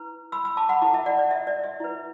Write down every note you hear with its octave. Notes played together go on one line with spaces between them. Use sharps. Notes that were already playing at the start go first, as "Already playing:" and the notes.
Already playing: E4 B4
B5 E6
B5 E6
A5 D6
F#5 B5
E4 A4 A5 D6
E5 A5
D5 F#5
D5
E5
D5
E5
E4 B4